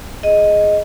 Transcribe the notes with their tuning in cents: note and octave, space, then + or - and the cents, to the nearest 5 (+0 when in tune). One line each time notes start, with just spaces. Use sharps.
G#4 +5 D#5 +0